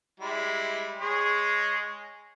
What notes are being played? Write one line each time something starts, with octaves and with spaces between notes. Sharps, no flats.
G3 G#3 E4
G#3 G#4 C#5